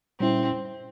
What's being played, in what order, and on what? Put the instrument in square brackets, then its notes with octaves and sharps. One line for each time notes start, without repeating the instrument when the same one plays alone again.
[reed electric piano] A#2 G3 C#4 E4 [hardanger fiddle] C4